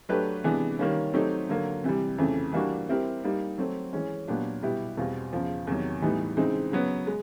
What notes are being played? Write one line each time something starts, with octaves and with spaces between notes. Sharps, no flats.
F#3 A3 D4 G4 B4
C3 E3 G#3 B3 D4
D#3 G3 A#3 C#4
F#3 A3 C4 D#4 G4
D3 F#3 A#3
C3 E3 G3
F2 C#3 E3 A3
E3 G3 A#3 D4 F#4
G3 C4 E4 G4 A#4
G3 A#3 D#4
F#3 A3 C4
E3 G#3 C#4
A#2 F#3 B3 D4 G4
B2 G3 B3 E4 G4
E2 B2 G3 C4 F4
E2 C#3 F3
E2 C3 D#3 F#3
A2 E3 G3 B3 D#4
C#3 E3 G#3 C4 D#4
C#3 F#3 B3
G#3